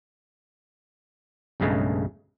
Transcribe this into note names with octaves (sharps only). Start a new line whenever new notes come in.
B1 G2 C#3 G#3 A3